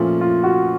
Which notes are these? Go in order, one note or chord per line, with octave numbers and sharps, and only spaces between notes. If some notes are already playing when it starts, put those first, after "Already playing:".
Already playing: A#2 F3 A3 C#4 F4
F4
F#4